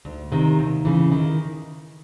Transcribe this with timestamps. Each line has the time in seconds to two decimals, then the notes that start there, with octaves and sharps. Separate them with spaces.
0.05 D2
0.32 C3 D#3
0.59 D#2
0.85 C#3 E3
1.12 D#3